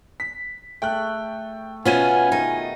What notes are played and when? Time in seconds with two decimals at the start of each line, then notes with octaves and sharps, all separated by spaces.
0.20 B6
0.82 A3 G5 F#6
1.85 B2 B3 C#4 F4 G#5 D#7
2.32 D#3 D#4